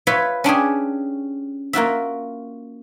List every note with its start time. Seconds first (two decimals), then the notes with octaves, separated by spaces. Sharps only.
0.07 F4 B4 C#5 E5
0.44 C#4 D4 G4 G#4
1.73 A#3 F4 F#4 E5